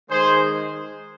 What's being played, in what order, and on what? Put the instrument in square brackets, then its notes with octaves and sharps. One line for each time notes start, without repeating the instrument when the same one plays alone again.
[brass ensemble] D#3 G#3 G#4 C5